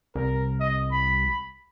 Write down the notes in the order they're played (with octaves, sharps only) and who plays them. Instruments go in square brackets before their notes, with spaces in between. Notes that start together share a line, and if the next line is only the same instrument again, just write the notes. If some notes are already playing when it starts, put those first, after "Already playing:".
[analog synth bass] C2 [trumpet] A#4
[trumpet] D#5
B5